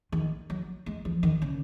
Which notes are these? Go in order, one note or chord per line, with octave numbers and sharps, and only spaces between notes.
D#3
F#3
G#3
F3
D#3
C#3